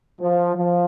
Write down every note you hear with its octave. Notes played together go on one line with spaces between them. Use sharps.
F3
F3